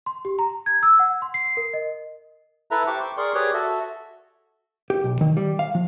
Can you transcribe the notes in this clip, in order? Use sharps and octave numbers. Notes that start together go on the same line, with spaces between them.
C6
G4
A#5
G#6
E6
F#5
C6
C7
A#4
D#5
E4 A4 B4 E5 A#5
G4 C5 E5 G5 C#6 D6
G5 C6 C#6
G#4 A#4 D5 C6 C#6
G4 G#4 B4 C#5 D5
F#4 A4 E5
G4
B1
D#3
G3
F5
F3